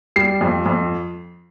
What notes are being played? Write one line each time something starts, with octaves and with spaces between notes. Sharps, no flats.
G3 C7
F2
F2